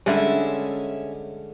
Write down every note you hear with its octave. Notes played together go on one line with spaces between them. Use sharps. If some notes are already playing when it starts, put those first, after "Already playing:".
D3 G3 G#3 C#4 E5